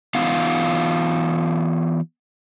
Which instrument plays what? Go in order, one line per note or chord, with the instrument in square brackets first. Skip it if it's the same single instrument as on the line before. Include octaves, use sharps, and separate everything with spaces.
[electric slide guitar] E3 B3 D#4 F4 F5 F#5